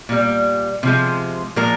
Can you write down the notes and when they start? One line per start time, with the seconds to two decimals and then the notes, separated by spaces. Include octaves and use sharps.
0.09 A#2 G3
0.83 C3 F3 G#3
1.56 A#2 F3 G#3 A#4